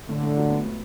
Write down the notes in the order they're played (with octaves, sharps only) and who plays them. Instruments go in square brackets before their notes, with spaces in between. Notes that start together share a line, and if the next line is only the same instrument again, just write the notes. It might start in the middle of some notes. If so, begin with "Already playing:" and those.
[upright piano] A2 [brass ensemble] D3
[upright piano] A2
F#3
B3
A2